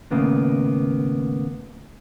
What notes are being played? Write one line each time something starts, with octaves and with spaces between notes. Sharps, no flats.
D#2 A2 C#3 A#3 B3